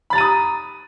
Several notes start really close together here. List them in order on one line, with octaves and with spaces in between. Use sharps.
B5 A6 A#5 D#7 D#6